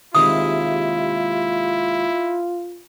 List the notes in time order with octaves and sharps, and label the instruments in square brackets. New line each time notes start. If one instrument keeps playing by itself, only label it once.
[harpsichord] D#2 C3 G#3 [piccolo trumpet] E4 [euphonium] F4 [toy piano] D#6